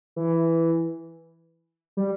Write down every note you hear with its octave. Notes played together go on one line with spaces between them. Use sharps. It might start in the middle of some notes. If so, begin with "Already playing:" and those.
E3
G3